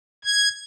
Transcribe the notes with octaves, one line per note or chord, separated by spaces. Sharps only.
G#6